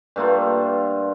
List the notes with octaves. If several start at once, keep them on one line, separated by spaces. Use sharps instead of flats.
G2 A3 A#3 F4